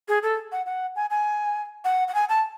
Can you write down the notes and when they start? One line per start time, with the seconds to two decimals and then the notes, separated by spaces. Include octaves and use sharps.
0.08 G#4
0.23 A4
0.52 F#5
0.66 F#5
0.96 G#5
1.10 G#5
1.85 F#5
2.08 F#5
2.15 G#5
2.29 A5